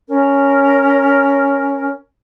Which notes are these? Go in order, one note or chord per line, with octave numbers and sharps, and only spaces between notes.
C#4 A#4